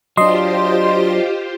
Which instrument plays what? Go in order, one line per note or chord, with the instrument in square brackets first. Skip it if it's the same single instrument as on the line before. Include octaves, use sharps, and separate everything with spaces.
[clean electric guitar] F#3 D4 [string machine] F4 G4 C5 [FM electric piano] D#5 C6